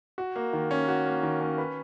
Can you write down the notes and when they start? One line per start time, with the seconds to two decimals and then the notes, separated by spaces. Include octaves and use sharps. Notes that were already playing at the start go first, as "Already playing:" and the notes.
0.18 F#4
0.36 A#3
0.53 D#3
0.71 C#4
0.88 F#4
1.06 A#3
1.23 D#3
1.41 C#4
1.58 B4